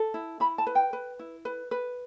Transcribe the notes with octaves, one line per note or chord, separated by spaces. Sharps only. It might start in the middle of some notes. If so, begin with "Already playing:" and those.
Already playing: A4
E4
E4 B5
A5
B4
G5
B4
E4
B4
B4